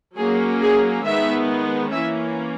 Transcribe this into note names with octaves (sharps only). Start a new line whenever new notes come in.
F#3 A#3 C#4 G#4
G#4
D#3 G#3 B3 E5
E3 A#3 C#4 E5